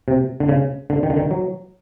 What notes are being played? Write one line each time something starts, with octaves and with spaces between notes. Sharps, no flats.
C3
D3
C#3
D3
D#3
D3
D#3
F#3